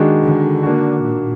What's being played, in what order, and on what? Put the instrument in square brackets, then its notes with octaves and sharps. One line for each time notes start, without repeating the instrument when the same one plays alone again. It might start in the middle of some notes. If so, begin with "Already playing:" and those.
Already playing: [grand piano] D#3 G#3 D4 F#4
[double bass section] D3
[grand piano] A#3 D4 F#4
[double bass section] A#2